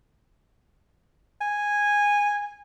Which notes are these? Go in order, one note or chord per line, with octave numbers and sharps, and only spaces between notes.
G#5